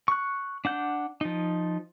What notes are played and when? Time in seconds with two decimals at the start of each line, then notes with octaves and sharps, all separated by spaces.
0.08 C#6 F#6
0.65 D4 F#5 G6
1.21 F3 D#4